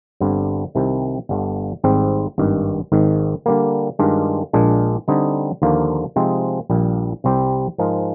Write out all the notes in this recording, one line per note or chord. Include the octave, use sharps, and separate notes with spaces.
G1 G2 D3 G3 C4
C2 C3 D#3
G1 G2 D3
G#1 G#2 G3 C4 G4
G#1 G2 D#3
G#1 G#2 D#3
D3 G3 A#3
G2 D#3 G#3 D4 F4
A#1 A#2 G#3 D4
D3 G3 C4 D#4
D#2 D3 F3 A#3 F4
C3 F3 G#3 C4 D#4
A#1 A#2 G3
C2 C3 G3 C4 G4
G#2 F3 G#3 D#4 A#4